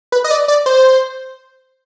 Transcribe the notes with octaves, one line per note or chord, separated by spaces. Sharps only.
B4
D#5
D5
D5
C5